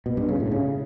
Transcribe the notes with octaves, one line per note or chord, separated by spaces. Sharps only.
B2
G2
C#3
A2
C#3